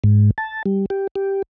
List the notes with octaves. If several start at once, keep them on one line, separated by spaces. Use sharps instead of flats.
G#2
A5
G3
G4
G4